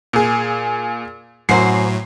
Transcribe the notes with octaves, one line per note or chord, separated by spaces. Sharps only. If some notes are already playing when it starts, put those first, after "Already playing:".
A#2 G#4
F#2 A2 F#3 F#4 C5 C7